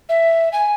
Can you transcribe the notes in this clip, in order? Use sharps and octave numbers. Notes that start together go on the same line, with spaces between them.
E5
G#5